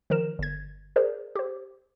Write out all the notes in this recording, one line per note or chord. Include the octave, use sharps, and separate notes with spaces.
D#3 F3 A#4 E7
G1 G#6
G#4 A#4 C5 D5
G4 C5